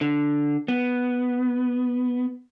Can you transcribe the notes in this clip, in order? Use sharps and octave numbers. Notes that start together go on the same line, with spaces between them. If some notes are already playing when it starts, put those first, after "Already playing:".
D3
B3